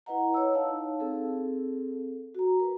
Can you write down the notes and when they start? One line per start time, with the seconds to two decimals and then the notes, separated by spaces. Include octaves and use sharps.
0.06 E4 B4 D#5 F#5 A#5
0.34 C#5 E6
0.54 D#4 F5 A5
1.00 C4 G#4 A4
2.35 F#4 A#5
2.60 A#4 B4